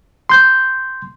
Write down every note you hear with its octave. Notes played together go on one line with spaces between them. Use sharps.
C6 G6